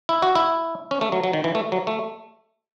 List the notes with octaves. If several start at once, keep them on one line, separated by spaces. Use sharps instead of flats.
E4
F#4
E4
C#4
A3
F#3
F#3
D#3
E3
A3
F#3
A3